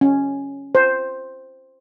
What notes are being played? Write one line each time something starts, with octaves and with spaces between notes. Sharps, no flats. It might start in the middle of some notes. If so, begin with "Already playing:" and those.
C#4
C5